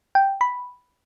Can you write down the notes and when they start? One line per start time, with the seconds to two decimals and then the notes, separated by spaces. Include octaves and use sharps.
0.15 G5
0.41 B5